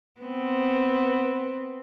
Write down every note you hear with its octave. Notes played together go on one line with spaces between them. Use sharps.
B3 C4